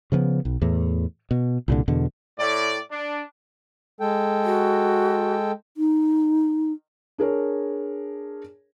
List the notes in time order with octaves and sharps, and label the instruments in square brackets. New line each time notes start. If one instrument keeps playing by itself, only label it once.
[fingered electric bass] C#3 F3 A3 B3
B1
E2 A2
B2
C2 A#2 D3
E2 B2 D3
[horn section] A2 D5
D4
[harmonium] G#3 A4 G5
[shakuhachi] F#4
[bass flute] D#4
[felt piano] D4 G#4 A#4 C#5